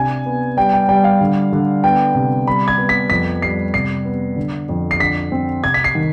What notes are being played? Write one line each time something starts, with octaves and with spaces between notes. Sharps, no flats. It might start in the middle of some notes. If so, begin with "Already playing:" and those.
Already playing: C3 D4 G#5
B3
G3 G5
G5
G3 G5
F5
D3
D3
B3 G5
C3
G3 B5
G#6
B3
B6
F2 B6
G3 C7
C3 C7
B3
D3
F2
C7
D3 B6
C4
C3 G#6
B6
C7
D#3